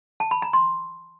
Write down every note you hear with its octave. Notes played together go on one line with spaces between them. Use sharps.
A5
B5
A#5
C6